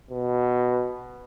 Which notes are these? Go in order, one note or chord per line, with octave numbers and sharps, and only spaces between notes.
B2